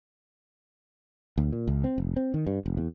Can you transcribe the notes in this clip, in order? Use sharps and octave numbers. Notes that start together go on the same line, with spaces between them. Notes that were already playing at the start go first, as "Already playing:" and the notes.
D2
A#2
C#2
C4
F1
C4
D#3
G2
F1
E2